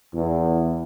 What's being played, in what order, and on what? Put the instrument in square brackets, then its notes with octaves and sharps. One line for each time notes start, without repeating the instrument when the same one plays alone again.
[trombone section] E2